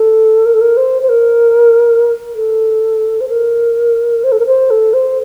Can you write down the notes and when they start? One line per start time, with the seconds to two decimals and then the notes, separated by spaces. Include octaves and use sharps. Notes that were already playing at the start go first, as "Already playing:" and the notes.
Already playing: A4
0.45 A#4
0.53 A4
0.61 A#4
0.76 C5
1.02 C5
1.09 A#4
2.34 A4
3.20 C5
3.28 A#4
4.23 C5
4.31 A4
4.39 A#4
4.46 C5
4.70 A4
4.93 C5